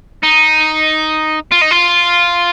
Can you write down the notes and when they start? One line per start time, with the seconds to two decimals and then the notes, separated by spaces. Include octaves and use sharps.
0.23 D#4
1.52 F4
1.62 D#4
1.71 F4